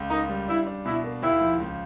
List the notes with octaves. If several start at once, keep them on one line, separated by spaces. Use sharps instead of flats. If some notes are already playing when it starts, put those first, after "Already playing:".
Already playing: C#2
A#3 D#4
G3
D4 E4
D4
B2 E4
A#3
D#2 E4
F3
C#2